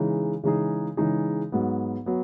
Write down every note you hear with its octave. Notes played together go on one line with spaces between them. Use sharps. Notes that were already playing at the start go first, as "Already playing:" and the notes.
Already playing: C#3 E3 G#3 D#4 G#4
C#3 E3 G#3 D#4 G#4
C#3 E3 G#3 D#4 G#4
G#2 F#3 B3
F#3 B3